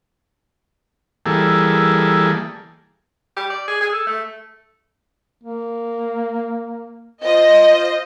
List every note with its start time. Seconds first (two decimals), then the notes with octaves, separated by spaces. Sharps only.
1.26 E3 G3 A#3 G#4 A4
3.37 G4
3.50 D5
3.68 G#4
3.81 G#4
3.93 A4
4.07 A3
5.43 A#3
7.25 F4 C5 D#5